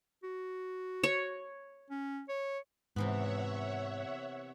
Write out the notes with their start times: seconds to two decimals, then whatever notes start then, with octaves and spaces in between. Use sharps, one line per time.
0.24 F#4
1.03 C#5
1.90 C#4
2.29 C#5
2.96 G#2 C3 E3 B3 C#5 E5 F#5